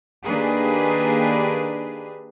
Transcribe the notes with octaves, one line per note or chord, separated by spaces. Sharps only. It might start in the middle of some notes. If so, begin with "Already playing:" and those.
D#3 A#3 D4 G4 G#4 B4